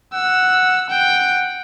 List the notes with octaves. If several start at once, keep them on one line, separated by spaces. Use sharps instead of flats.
F#5 E6
F#5 G5